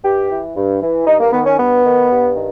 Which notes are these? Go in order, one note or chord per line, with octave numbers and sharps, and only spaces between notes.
G2 G4
E3
G2
E3
G2 D#4
A#3
D#3 B3
C#4
G2 B3
D#3
G2
D#3